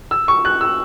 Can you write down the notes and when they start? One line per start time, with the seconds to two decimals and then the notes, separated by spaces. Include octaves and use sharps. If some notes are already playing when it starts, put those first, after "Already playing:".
0.11 E6
0.28 C#6
0.45 F#6
0.61 E6